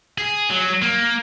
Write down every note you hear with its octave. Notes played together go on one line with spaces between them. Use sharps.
G#4
F#3
A#3